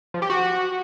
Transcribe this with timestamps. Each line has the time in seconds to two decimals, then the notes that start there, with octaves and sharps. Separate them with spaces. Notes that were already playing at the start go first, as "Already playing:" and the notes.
0.14 F3
0.22 G4
0.30 F#4